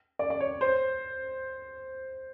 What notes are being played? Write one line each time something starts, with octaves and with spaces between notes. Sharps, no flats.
D5
D5
C#5
C5